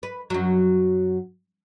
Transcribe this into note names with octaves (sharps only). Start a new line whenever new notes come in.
B4
F#2 F#3